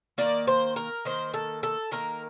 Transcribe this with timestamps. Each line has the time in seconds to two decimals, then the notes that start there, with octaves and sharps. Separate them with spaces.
0.18 D#3 A#3 D5
0.47 C5
0.76 A#4
1.05 D#3 A#3 C5
1.34 A4
1.63 A4
1.91 D#3 A#3 A#4